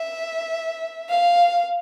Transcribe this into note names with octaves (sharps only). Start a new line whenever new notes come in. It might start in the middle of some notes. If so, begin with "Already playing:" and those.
Already playing: E5
F5